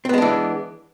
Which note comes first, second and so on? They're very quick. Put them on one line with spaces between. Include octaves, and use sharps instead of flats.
C4 B3 G#3 D4 E3